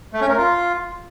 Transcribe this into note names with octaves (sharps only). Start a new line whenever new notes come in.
A3
C#4
A#4
F4